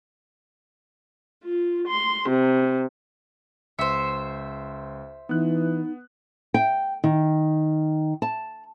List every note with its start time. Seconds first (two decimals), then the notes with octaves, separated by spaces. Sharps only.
1.44 F4
1.87 C6
2.28 C3
3.79 C#2 C5 E5 C#7
5.29 E3 B3 D#4 F#6
6.54 G5
7.04 D#3
8.22 A5